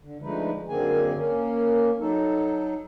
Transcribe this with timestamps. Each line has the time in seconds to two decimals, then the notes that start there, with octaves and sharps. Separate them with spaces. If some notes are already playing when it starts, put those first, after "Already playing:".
0.02 D3
0.22 D3 F3 G#3 A3 D#4 B4
0.68 F#2 D3 A#3 C4 G#4 G#5
1.14 A#3 C#4
2.00 F#3 D#4 A4